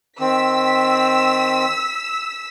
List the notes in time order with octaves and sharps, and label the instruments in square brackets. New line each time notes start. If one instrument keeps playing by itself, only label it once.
[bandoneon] D#3 C4 [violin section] E6 B6